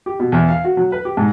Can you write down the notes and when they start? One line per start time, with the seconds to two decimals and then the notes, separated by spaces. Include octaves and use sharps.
0.06 G4
0.20 B2
0.32 E2
0.49 F5
0.65 F#4
0.77 F#3
0.92 B4
1.05 G4
1.17 G#2